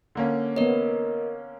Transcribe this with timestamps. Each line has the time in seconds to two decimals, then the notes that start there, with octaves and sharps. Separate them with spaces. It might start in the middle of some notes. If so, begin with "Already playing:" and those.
0.15 D3 A#3 C#4
0.56 B3 A#4 C#5 D#5